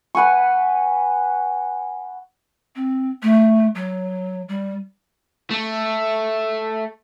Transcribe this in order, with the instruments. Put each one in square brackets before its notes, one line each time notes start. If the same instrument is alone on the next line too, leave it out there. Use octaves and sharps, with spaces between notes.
[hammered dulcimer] B4 F#5 G#5 C#6
[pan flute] C4
A3
F#3
G3
[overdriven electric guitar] A3